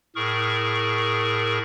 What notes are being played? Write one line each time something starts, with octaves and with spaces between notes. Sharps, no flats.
A2 G#4 A#4 C#6